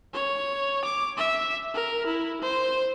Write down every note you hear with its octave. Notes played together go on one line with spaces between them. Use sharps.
C#5
D6
E5
A#4
E4
C5